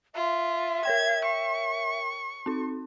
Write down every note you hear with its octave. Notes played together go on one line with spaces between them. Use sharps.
F4 E5
A#4 C#5 G5 G#6
C#6
C4 D#4